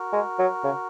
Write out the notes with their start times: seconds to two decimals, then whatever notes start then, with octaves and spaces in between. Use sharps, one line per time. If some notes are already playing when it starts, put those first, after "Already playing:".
Already playing: F#4 A#4
0.13 G#3
0.39 F#3
0.64 C#3